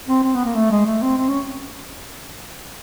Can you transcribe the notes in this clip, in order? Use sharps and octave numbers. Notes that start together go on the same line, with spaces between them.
C4
C4
B3
A#3
A3
G#3
A3
C4
C4
C#4